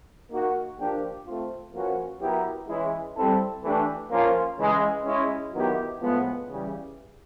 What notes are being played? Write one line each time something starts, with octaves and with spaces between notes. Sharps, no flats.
A#3 D#4 F#4 A#4
F3 A#3 D4 G4
A3 C4 F4
F3 A#3 C#4 F#4 B4
F#3 B3 E4 G4 A#4
E3 G#3 C#4 E4
G3 C4 E4 A4
E3 A3 D4 G4 B4
F3 A#3 C#4 F4
C#3 E3 G#3
G#3 C#4 E4
D#3 F#3 B3 E4 G4
A2 F3 G#3 B3
C#3 E3 G3